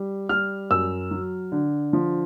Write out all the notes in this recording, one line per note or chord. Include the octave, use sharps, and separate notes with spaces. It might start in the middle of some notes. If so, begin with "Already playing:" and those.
Already playing: G3
G3 F6
F#2 E6
F#3
D3
F3